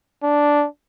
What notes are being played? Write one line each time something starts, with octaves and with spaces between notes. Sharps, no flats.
D4